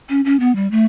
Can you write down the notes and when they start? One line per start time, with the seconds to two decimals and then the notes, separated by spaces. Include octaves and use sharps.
0.09 C#4
0.25 C#4
0.40 B3
0.56 G3
0.71 A3